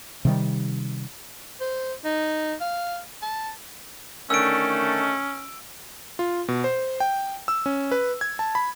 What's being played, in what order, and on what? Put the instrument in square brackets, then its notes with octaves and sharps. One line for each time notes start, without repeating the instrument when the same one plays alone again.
[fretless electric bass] C3 D#3 G3
[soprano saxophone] C5
D#4
F5
A5
[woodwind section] D3 D#3 A3 [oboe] C#4 [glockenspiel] E6 D7
[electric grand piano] F4
B2
C5
G5
E6
C#4
B4
G#6
A5
B5